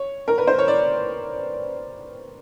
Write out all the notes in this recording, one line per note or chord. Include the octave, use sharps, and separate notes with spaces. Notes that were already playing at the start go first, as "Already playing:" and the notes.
Already playing: C#5
A#4
B4
C5
C#5
D5